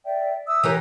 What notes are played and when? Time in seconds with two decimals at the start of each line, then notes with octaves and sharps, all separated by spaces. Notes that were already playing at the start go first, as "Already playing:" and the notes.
0.05 D5 E5 G5
0.47 E5 D#6 E6
0.64 E3 G4 A#4 C#5